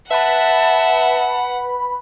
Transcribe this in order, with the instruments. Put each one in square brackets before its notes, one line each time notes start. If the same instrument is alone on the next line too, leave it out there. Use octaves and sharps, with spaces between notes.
[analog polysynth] B4 B5 [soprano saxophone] E5 [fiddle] F#5 [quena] A5